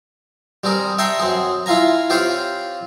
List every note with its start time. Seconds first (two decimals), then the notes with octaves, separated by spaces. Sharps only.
0.64 G3 C4 G#4 A#4
0.98 E5 G5 A5 A#5 C6 C#6
1.19 F#2 C4 G#4
1.66 E4 F4 F5 G#5 A#5
2.10 C4 F4 G4 C5 C#5 F5